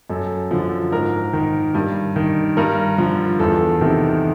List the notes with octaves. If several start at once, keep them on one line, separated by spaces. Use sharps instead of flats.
F#2 A4
D3 F3
G#2 A#4
D#3
G2
D#3
G2 A#4
D3 F3
E2 A4
C3 D#3